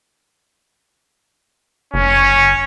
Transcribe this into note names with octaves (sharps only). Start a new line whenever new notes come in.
F#1 C#4